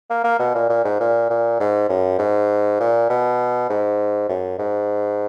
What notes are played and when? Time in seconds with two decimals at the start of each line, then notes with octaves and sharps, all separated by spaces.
0.10 A#3
0.24 A#3
0.39 B2
0.55 A#2
0.69 A#2
0.85 G#2
1.00 A#2
1.30 A#2
1.60 G#2
1.89 F#2
2.19 G#2
2.80 A#2
3.09 B2
3.70 G#2
4.29 F#2
4.59 G#2